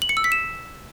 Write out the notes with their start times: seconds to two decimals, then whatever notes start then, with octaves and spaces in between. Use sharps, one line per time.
0.02 F#7
0.09 C#7
0.17 E6
0.24 B6
0.32 E7